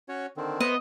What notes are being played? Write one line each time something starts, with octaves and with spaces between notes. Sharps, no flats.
C#4 F#4 C#5
D3 D#3 C4
B3 C5 D#5